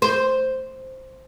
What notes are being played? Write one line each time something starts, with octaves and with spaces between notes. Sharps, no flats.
C5